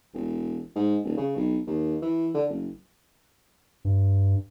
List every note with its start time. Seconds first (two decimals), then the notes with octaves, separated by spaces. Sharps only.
0.14 E1
0.75 G#2
1.04 D#1
1.17 C#3
1.36 B1
1.67 D#2
2.02 E3
2.34 D3
2.50 F#1
3.85 G2